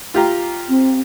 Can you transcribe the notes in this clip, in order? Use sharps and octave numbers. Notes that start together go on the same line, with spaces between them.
F4 G4 A#5
C4